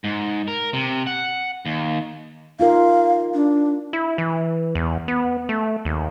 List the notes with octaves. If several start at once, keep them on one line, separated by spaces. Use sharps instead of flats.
G#2
A#4
C3
F#5
D#2
D#4 F4 A#4 F5
D4
E4
E3
E2
B3
A3
D#2